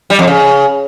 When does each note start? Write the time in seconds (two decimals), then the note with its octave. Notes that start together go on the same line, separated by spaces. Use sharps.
0.10 G3
0.19 F2
0.27 C#3